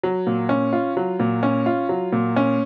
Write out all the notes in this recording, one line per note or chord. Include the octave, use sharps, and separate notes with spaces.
F#3
A#2
C#4
F4
F#3
A#2
C#4
F4
F#3
A#2
C#4